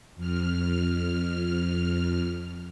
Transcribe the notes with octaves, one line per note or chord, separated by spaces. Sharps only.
F2 F6